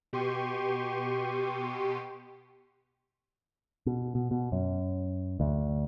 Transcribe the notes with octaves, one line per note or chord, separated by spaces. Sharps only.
B2 G4 C6 C#6 D#7
B2
B2
B2
F#2
D2